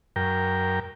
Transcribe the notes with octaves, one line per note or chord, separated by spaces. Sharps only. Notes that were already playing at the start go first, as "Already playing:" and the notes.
F#2 A#4 G5